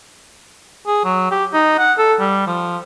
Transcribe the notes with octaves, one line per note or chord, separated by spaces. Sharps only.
G#4
F#3
G4
D#4
F#5
A4
G3
F3